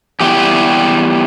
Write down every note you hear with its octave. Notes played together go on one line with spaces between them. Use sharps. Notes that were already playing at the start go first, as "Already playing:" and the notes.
E2 E3 G3 G4